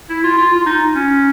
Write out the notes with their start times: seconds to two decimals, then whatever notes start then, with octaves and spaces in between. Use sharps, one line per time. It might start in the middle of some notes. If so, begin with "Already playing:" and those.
0.10 E4
0.24 F4
0.38 F4
0.53 F4
0.66 D#4
0.95 C#4